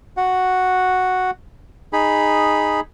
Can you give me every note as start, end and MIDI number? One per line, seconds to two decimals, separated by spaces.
0.17 1.31 66
0.17 1.31 78
1.93 2.80 63
1.93 2.80 68
1.93 2.80 83